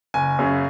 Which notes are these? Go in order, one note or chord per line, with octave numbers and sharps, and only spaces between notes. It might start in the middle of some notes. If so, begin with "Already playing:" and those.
F#1 G#5
F#2 C#3 F#3